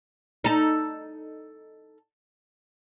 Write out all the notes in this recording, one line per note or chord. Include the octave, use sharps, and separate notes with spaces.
D#4 A4